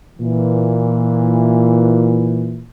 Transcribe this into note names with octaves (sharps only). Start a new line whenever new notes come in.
A#2 E3